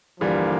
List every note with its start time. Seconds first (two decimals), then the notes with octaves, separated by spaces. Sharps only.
0.20 G2 D3 E3 F3 G3 A#3